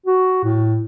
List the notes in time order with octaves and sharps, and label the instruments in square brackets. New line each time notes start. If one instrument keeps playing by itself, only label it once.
[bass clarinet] F#4
A2